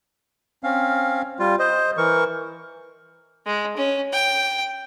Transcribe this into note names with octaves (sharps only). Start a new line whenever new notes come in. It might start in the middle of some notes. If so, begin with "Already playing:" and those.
C4 C#4 F5
G3 F4
C5 D#5
E3 A#4 C#6
G#3
C#4
G5